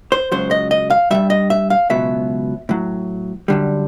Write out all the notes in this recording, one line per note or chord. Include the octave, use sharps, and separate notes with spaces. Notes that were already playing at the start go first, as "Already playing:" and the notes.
C5
C#2 C#3 F#3 C5
D#5
D#5
F5
G2 D#3 G3 E5
D#5
E5
F5
C#2 B2 F#3 E5
A2 F#3
F#2 D3 G3